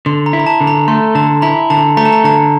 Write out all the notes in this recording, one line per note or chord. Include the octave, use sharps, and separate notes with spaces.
D3 C6
A#5
E4
A#5
A5
D3
A#5
A3 C6
D3 A5
E4 A#5
D3 A5
A3 A#5
A5
A#5
D3 A5